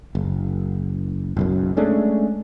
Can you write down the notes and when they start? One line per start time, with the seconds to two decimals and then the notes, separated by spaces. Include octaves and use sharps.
0.15 F#1
1.37 F#1 B1 F#2
1.77 G#3 A3 C#4 D4